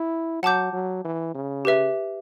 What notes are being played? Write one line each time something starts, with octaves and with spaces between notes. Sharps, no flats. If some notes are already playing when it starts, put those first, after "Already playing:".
Already playing: E4
F#3 F#5 A5 D6 G6
F#3
E3
C#3
G4 B4 E5